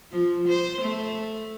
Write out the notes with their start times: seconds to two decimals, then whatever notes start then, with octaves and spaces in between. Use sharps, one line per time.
0.11 F3
0.48 C5
0.81 A3